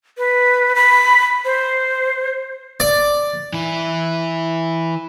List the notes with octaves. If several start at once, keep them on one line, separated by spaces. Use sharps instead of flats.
B4
B5
C5
D5
E3 E4